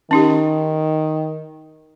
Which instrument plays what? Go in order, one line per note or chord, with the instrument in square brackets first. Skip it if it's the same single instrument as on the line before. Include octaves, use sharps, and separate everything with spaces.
[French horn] D#3 [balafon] C#4 D#4 G4